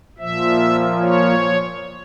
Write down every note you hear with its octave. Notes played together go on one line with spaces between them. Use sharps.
A#2 F3 E5
C#5